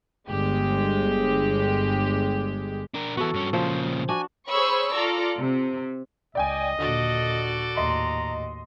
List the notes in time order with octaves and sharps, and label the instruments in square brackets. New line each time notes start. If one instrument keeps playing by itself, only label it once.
[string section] G1 G#3 G4
[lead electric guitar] D4 A#4
[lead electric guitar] E3 B3 [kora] F#4 A4
[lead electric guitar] G2 C#4
[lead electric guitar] A#2 C#3 [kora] F3 C5
[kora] D4 F#4 [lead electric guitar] G#5
[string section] G#4 C5 C#5 B5 C#6 E6
F4 A4 D5 A#5
C3
[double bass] C#2 [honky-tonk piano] D5 G5 G#5 [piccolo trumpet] D#5
[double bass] D#2 A#2 [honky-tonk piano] D3 [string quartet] F#4 A4 D5
[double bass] D#2 A2 [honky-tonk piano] D#5 C6 [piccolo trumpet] A#5